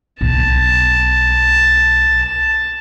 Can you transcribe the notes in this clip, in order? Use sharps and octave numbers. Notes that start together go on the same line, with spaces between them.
B1 A5